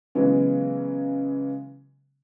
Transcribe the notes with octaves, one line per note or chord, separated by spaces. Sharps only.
C#3 E3 F#3 G#3 B3 C#4